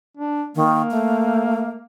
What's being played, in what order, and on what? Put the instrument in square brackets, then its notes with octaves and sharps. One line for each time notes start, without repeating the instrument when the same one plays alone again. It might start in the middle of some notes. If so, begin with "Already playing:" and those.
[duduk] D4
[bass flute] D#3 [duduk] A#3
[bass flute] A3